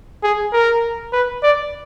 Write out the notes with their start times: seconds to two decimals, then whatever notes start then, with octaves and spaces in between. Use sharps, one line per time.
0.23 G#4
0.53 A#4
1.13 B4
1.43 D5